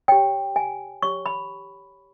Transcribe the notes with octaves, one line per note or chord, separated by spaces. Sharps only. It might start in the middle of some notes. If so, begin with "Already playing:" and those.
G4 C#5 G5
G#5
G4 C#5 C#6
B5